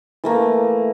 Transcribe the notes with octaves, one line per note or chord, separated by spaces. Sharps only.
E3 A3 A#3